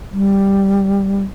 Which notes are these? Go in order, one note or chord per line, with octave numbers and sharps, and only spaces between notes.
G3